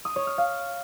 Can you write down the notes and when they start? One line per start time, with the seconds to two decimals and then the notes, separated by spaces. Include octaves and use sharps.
0.05 D#6
0.16 C#5
0.27 F6
0.38 F5